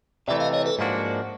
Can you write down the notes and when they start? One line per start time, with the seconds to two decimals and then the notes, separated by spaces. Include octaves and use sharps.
0.27 C3 E3 A3 D5 E5
0.40 D#5 F5
0.53 C#5 D#5
0.66 A4 B4
0.79 G#2 F3 A#3 D4 F#4